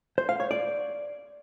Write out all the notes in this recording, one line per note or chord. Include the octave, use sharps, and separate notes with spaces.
C5
F5
C#5
D5